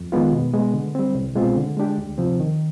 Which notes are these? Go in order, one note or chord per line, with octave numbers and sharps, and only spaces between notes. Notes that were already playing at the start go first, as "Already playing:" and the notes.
Already playing: F2
D#3 G#3 B3 F4
B2
G#3 B3
D3
G3 C4
C2
B2 G#3 C4 F4
D3
G#3 D4 G4
D2
C3 F3 C4
D#3